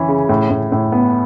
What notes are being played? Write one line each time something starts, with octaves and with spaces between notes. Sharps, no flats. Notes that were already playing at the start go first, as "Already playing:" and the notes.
Already playing: E3 C#4
C#3
A2
A2
A2
B3